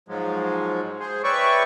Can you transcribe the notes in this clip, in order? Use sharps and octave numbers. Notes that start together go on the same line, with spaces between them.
G#2 F3 F#3 G#3
G#4 C5
B4 C#5 D5 E5 G5 C#6